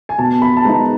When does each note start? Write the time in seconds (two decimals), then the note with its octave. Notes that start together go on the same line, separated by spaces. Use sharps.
0.09 G#5
0.18 B2 A5
0.42 B5
0.57 A5
0.65 G#3 B3 D#4 A#5